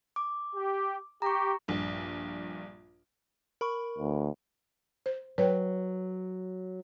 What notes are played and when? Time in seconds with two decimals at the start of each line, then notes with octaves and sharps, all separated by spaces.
0.16 D6
0.56 G4
1.22 G4 A#5 C#6
1.68 A#1 G2
3.61 A#4 B5 C#6
3.98 D2
5.06 C5
5.38 F#3 B4 C#5 G5